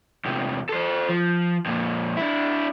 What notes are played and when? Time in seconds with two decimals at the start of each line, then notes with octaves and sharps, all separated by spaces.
0.25 E2 C3
0.69 A4 C5
1.09 F3
1.66 F2 A#2
2.17 D4 E4